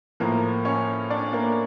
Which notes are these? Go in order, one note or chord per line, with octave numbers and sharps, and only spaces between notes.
A2 F3 A#3 A#4
C#4 C#5
D4 D5
A#3 A#4